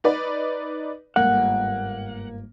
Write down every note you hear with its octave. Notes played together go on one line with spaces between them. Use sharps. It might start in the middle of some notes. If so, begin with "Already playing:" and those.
D#4 B4 D5
G1 G#2 A#3 F#5